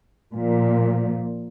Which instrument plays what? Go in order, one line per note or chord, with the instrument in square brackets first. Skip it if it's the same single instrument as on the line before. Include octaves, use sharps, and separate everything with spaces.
[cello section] A#2 F3